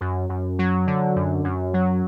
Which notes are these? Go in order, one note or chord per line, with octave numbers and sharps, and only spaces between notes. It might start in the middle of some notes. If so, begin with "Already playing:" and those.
F#2
F#2
F#3
D3
F#2
F#2
F#3